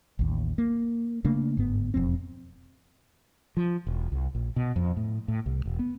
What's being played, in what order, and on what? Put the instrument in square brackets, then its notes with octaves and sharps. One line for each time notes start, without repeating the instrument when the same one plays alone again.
[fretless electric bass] A1 D#2
A#3
C#3 A3 A#3 D4
G1 G#2 B3
E1 F2 C4
F3
E1
C2
A#1
B2
F2
A2
A2
C2
E1
B3